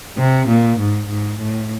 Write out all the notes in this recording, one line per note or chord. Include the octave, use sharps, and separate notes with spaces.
C3
A#2
G#2
G#2
A2